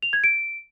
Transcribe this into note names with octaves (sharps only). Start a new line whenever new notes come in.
F7
G#6
D7